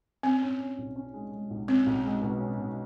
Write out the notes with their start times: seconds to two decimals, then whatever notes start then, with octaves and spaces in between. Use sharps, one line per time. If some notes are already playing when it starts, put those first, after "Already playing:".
0.23 C4 C#4
0.42 C#4
0.60 C#4
0.78 B1
0.96 C#4
1.14 G#3
1.32 G#3
1.50 B1
1.68 C4 C#4
1.86 B1
2.04 G#3
2.22 B2
2.40 C#4
2.59 B2